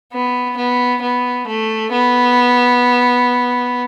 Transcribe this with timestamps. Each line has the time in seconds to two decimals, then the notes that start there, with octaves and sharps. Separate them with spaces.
0.13 B3
0.57 B3
1.02 B3
1.47 A3
1.92 B3